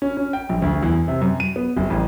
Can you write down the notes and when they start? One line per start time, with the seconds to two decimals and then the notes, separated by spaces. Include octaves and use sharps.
0.02 C#4
0.17 C#4
0.33 G5
0.49 A#1
0.62 D2
0.83 E2
1.08 C3
1.21 F#2
1.40 D#7
1.56 B3
1.77 F#1
1.90 A1